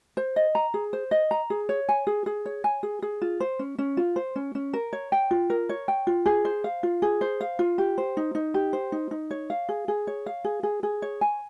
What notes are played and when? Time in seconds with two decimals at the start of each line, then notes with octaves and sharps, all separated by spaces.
0.17 C5
0.36 D#5
0.55 A#5
0.74 G#4
0.93 C5
1.11 D#5
1.31 A#5
1.50 G#4
1.69 C#5
1.89 G#5
2.07 G#4
2.26 G#4
2.46 C#5
2.64 G#5
2.83 G#4
3.02 G#4
3.22 F4
3.40 C5
3.59 C#4
3.78 C#4
3.97 F4
4.16 C5
4.36 C#4
4.55 C#4
4.73 A#4
4.93 C#5
5.12 G5
5.31 F4
5.50 A#4
5.69 C#5
5.88 G5
6.07 F4
6.26 G#4
6.45 C5
6.64 F5
6.83 F4
7.02 G#4
7.21 C5
7.41 F5
7.59 F4
7.78 G4
7.98 C5
8.17 D#4
8.35 D#4
8.54 G4
8.73 C5
8.92 D#4
9.11 D#4
9.31 C#5
9.50 F5
9.69 G#4
9.88 G#4
10.07 C#5
10.26 F5
10.44 G#4
10.63 G#4
10.83 G#4
11.02 C#5
11.21 G#5